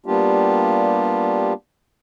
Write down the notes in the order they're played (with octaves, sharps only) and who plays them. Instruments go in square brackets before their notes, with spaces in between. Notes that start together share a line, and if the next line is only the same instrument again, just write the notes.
[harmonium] G3 A#3 B3 D4 F4 G4